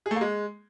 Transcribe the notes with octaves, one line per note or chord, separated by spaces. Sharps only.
G#4
A3
A#3
G#3